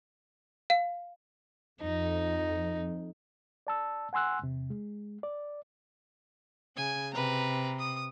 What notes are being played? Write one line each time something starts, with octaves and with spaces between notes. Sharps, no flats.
F5
F2 D#4
D5 A5 E6
F#5 G#5 C6 E6 F#6
E2 C3
G#3
D5
C#3 G#5
C3 B4 A#5
D#6